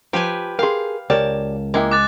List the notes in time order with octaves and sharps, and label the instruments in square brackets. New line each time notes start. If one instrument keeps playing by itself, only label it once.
[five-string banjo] F3 [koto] G4 B4 G#5
[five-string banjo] G4 G#4 [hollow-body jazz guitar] A#4 C6 [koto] F5
[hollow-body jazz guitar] C#2 A#4 C#5 [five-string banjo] G4 D5 [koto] A5
[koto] G#3 [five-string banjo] A#3 E4 G4
[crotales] D6 F#6 A6